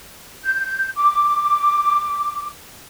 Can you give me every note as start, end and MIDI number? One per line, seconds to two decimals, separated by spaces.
0.43 0.88 91
0.96 2.46 86